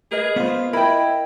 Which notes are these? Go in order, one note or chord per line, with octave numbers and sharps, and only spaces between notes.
G#4 A#4 B4 D#5
B3 F4 C5
E4 A#4 D#5 G5 B5